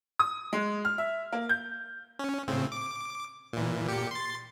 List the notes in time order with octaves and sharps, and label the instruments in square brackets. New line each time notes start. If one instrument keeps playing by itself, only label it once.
[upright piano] D#6
G#3
F6
E5
A#3
G6
[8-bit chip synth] C#4
A2 C#3 C4
D6
A#2 E3
A#2 G4 C#7
C6 A6